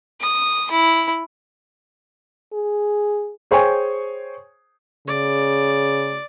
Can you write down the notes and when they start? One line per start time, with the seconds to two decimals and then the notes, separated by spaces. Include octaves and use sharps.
0.20 D#6
0.71 E4
2.53 G#4
3.51 G#4 C5 C#5 G5 G#5 C#6
5.08 C#3 D5